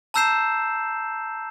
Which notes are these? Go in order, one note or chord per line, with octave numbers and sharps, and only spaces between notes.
A5 A#5 E6 G6 C7 E7